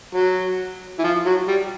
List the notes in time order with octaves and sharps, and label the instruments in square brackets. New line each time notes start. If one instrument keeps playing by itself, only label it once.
[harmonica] F#3
E3
F3
F#3
G3